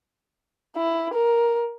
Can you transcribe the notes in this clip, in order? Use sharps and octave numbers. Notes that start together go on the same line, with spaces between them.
E4
A#4